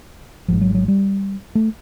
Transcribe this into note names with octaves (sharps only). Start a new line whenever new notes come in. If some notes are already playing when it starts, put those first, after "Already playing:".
G#1 G#2 F3
F#3
F#3
G3
A3